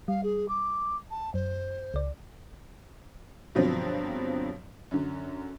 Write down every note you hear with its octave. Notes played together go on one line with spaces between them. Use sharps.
G3 F5
G#4
D6
A5
F#2 C5
C#2 D5
G2 B2 D3 F3 F#3 C4
F#2 D3